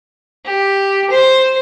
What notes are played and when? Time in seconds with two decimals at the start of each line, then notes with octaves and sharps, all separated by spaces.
0.45 G4
1.10 C5